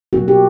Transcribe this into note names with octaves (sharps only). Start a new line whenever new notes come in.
B2 F#3 A#3 F#4
G4